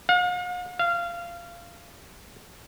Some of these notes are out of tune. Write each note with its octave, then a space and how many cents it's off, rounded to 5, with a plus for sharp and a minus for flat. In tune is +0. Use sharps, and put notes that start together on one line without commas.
F5 +45
F5 -20